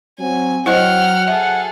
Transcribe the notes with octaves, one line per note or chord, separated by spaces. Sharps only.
F#3 C4 G#5
F#3 E4 C5 D#5 F#5 G5 F6
G#4 A4 E5